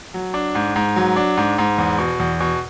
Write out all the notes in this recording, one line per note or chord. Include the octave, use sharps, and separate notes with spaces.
F#3
D4
G#2
G#2
F#3
D4
G#2
G#2
E2
B2
E2
B2